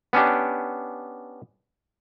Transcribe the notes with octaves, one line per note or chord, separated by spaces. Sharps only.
B3 C#4 D4 G4